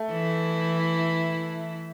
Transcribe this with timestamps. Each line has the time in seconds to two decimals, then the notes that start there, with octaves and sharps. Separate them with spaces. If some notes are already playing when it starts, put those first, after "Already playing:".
Already playing: A3
0.11 E3 E4